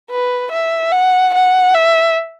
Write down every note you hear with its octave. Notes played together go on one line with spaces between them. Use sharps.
B4
E5
F#5
F#5
E5